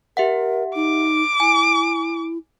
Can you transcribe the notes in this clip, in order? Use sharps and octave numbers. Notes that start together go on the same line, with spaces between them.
G4 A#4 E5 F#5
D#4 D6
E4 G#5